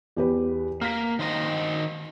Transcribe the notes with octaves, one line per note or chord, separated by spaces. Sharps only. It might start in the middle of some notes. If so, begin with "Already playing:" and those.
E2 G4 B4
A#3 F6 B6
D#3 C5 D#5